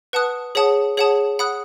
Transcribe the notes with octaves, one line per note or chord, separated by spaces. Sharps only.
B4 F#5 A5 D#6 F#6
G#4 C#5 F#5 A5 D#6
G#4 C#5 F#5 A5 D#6
F#5 B5 D#6 F#6